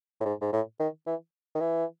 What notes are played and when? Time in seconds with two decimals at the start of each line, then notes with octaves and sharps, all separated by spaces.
0.20 A2
0.25 G#2
0.41 G#2
0.53 A2
0.79 D#3
1.07 E3
1.55 D#3
1.60 E3